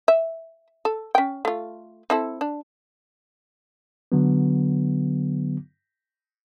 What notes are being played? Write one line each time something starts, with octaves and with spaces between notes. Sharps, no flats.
E5
A4
C#4 G5
A3 F4
C4 E4 A4
D4
D3 F#3 B3